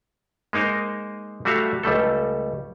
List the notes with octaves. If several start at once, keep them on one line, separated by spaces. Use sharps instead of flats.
G#3 A#3 D#4 A#4 C5
G3 A3 F#4 E5 F5
C#2 G3 A3 A4